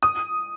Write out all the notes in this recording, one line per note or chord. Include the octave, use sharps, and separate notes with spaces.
D#6